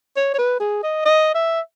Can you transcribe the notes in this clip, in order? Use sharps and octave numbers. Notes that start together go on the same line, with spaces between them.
C#5
C#5
B4
G#4
D#5
D#5
E5